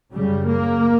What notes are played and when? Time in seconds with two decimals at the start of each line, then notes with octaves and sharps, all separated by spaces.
0.13 F#2 C#3 G3
0.46 A#3